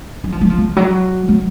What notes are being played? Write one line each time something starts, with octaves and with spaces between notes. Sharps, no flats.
F#3
F3
F#3
F3
C#3
F#3
F#3